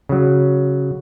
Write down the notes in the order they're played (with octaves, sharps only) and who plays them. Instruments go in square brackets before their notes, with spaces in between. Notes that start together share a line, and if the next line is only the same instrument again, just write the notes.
[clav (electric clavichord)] C#3 F#3